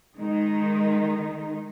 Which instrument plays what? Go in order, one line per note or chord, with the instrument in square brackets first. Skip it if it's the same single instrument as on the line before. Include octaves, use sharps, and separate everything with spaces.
[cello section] D#3 G#3 D#4